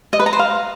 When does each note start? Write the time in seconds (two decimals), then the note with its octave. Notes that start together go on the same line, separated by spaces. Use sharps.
0.13 D#5
0.19 B4
0.26 A#5
0.33 C5
0.39 F5